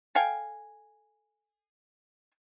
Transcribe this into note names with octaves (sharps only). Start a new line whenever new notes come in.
A4 F5 G5 G#5